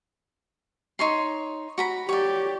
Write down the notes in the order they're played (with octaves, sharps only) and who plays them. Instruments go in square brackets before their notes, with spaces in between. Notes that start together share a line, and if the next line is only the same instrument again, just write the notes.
[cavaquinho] D#4 C#5 C6
F#4 A#5 B5
[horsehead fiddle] G4 [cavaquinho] C#5 D5